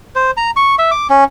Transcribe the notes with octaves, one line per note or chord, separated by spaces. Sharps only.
C5
A#5
C#6
E5
D6
C#4